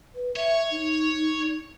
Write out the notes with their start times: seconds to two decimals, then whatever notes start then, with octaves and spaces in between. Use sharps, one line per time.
0.15 B4
0.36 C#5 E5
0.71 D#4